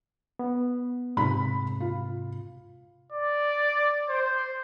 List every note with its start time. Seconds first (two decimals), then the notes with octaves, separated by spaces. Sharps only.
0.39 B3
1.17 G#2 C3 B5
1.80 F4
3.12 D5
4.09 C5